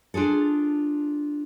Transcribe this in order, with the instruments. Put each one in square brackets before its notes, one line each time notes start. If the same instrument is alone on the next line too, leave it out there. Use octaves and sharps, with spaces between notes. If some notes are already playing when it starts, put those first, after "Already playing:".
[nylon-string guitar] D4 F4 G#4 A4